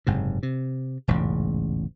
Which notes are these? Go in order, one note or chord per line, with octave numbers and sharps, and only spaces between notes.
F#1 G#2 C3
C3
E1 A1 G#2 C#3